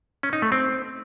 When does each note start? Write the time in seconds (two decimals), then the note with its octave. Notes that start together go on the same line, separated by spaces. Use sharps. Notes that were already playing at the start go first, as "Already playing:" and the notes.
0.23 C#4
0.33 D#4
0.42 A3
0.52 C4